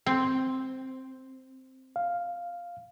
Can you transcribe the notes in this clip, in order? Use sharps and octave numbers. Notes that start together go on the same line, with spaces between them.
C4
F5